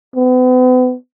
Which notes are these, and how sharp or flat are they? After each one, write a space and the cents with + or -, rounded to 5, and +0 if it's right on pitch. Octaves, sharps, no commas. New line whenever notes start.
B3 +40